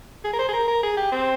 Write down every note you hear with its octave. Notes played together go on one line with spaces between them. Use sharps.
G#4
A#4
C5
G#4
A#4
A#4
G#4
G4
C4